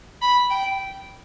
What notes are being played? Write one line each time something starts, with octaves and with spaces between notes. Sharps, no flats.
B5
G5